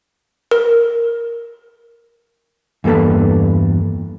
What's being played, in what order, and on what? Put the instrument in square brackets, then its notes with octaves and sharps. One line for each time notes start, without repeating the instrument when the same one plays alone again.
[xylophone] A#4
[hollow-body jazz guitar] E2 G2 A#3 A4 B4